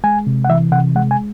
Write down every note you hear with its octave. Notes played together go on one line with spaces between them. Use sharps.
G#3 G#5
C3
F#5
E3 E5
C3 F#5
G#3 F#5
G#5